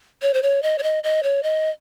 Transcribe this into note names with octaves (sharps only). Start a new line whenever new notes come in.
C#5
C5
C#5
D#5
C#5
D#5
D#5
C#5
D#5